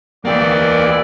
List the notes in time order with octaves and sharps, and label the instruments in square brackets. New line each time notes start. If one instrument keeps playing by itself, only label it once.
[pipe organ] E3 D5 [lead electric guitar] A#3 G4